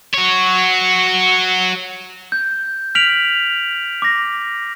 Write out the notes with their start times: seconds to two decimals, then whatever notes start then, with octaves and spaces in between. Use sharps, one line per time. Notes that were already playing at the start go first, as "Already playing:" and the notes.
0.14 F#4 C#5
2.32 G6
2.95 F6 B6 D7 F7 F#7
4.02 D6 A#6